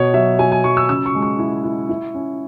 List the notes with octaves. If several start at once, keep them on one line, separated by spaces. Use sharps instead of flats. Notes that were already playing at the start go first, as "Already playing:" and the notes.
Already playing: B2 C#5
F#3 E5
F#3 G#5
G#5
F#3 C#6
E6
C#3 E6
C#6
G#3
C#6
E4
E4
E4
C#4